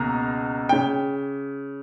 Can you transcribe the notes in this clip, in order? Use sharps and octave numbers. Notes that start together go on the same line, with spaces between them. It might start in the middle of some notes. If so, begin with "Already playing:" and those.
Already playing: C#2 B2 A#3 A#5
C#3 G5